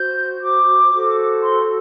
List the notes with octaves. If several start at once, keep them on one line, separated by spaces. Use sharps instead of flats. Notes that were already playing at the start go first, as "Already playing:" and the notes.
Already playing: F#4 C5 G6
D6
F#4 A4 C5
C6